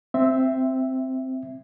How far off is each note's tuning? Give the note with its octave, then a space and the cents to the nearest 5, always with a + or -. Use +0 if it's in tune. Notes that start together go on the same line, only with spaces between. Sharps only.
C4 -5 E5 +0